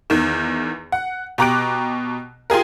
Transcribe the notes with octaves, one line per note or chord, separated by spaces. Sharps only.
E2 D#3
F#5
B2 G4 A#5 D6 F#6 D7
F4 G4 G#4 A#4